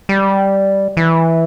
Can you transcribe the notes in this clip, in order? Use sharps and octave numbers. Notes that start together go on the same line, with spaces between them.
G3
E3